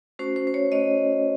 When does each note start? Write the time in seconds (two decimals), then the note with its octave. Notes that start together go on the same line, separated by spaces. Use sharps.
0.19 A3 C#4 F#4 C5
0.36 C5
0.47 C5
0.54 C#5
0.72 A3 C#4 F#4 D#5